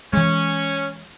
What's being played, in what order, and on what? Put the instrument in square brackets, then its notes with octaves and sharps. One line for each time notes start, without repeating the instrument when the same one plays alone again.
[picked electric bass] E3 G#3 [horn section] C#4